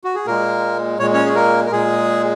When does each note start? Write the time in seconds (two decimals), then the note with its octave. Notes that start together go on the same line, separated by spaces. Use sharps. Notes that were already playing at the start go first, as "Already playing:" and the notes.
0.04 F#4
0.15 G#4
0.26 A#2 G#3 A#3 A#4
0.99 A#2 G#3 C#5
1.13 C#4 C#5
1.25 G#4
1.35 A#3 A#4
1.66 A#4
1.71 A#2 G#3 G#4